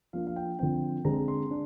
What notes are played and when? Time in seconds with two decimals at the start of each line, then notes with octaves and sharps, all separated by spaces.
0.13 F3 A#3 D4 F5
0.27 F5
0.36 G5
0.59 D3 F3 C4 G5
1.05 D3 G#3 C4 A#5
1.28 C6
1.51 D4